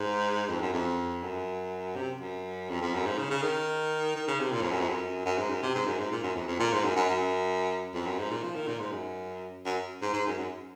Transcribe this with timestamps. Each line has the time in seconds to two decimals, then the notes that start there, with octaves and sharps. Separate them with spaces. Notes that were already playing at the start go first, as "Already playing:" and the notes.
Already playing: G#2
0.49 F2
0.61 F#2
0.73 F2
1.23 F#2
1.96 C3
2.20 F#2
2.70 F2
2.81 F2
2.94 F#2
3.06 G#2
3.18 C#3
3.31 C#3
3.42 D#3
4.16 D#3
4.28 C#3
4.40 C3
4.52 A#2
4.61 F2
4.71 F#2
4.80 F2
4.89 F#2
5.26 F#2
5.38 G#2
5.50 F#2
5.62 C3
5.75 G#2
5.87 F#2
5.99 G#2
6.11 A#2
6.23 F#2
6.36 F2
6.48 F2
6.60 A#2
6.72 G#2
6.84 F#2
6.96 F#2
7.09 F#2
7.94 F2
8.06 F#2
8.19 G#2
8.31 A#2
8.43 F3
8.55 D#3
8.68 A#2
8.79 G#2
8.92 F#2
9.65 F#2
10.02 G#2
10.13 G#2
10.27 F#2
10.38 F#2